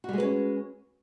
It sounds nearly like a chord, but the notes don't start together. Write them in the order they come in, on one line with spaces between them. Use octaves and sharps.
F#4 G3 G#3 B4 C#4